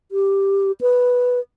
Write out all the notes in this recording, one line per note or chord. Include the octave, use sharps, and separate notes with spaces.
G4
B4